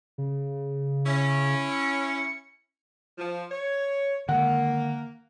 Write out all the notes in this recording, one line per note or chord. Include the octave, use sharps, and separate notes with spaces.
C#3
C#4 E4
C#7
F3
C#5
D3 D#3 G#3 A#3 F#5